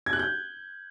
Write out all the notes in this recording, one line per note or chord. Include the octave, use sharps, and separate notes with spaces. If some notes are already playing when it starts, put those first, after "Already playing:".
G#6
F#6
G6